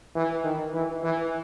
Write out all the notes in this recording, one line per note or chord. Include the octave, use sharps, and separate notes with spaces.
E3
D#3
E3
E3